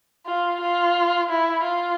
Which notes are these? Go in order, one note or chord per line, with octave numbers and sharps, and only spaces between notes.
F4
F4
E4
F4